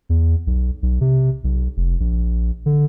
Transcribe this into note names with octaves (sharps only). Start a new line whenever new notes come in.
E2
B1
B1
C3
B1
F1
A#1
D3